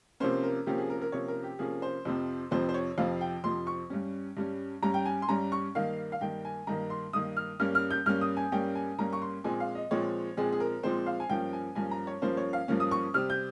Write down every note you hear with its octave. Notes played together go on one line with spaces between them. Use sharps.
C3 F3 A#3 C#4 C5
A#4
C3 F3 A#3 C#4 G4
G#4
A#4
A#4
C3 F3 A#3 C#4 C#5
A#4
G4
C3 F3 A#3 C#4 G#4
C5
F2 C3 F3 C4
F2 C3 F3 C4 C5
C5
C#5
F2 C3 F3 C4 F5
G5
F2 C3 F3 C4 C6
C#6
G2 G3 C#4
G2 G3 C#4
G2 G3 C#4 A#5
G5
G#5
C6
G2 G3 C#4 A#5
C#6
G2 D#3 A#3 F5
F5
G2 D#3 A#3 G5
G#5
G2 D#3 A#3 A#5
C6
G2 D#3 A#3 D#6
F6
G2 G3 A#3 C#4 F6
F6
G6
G2 G3 A#3 C#4 F6
D#6
G#5
G2 G3 A#3 C#4 G5
G#5
G2 G3 A#3 C#4 A#5
C#6
C6
A#2 F3 G#3 C4 G#5
F5
D#5
A#2 F3 G#3 C4 C#5
A#2 F3 G#3 C4 G#4
G#4
A#4
A#2 F3 G#3 C4 C5
F5
G#5
G2 F3 A#3 C#4 G5
G#5
G2 F3 A#3 C#4 G#5
A#5
C#5
G2 F3 A#3 C#4 C5
C#5
F5
G2 F3 A#3 C#4
D#6
C#6
C3 G3 C4 F6
G6